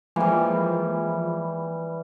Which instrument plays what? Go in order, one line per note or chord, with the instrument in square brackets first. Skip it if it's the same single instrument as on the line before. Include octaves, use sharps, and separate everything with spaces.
[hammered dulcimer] E3 G3 [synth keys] F3 G#3 A#3